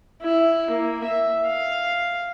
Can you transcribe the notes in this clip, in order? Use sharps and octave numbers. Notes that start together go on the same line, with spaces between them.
E4
A#3
E5
F5